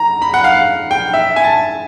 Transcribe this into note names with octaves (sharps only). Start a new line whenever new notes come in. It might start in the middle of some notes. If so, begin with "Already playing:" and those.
Already playing: A#5
B5
F#5
F5
G5
E5
G#5
A5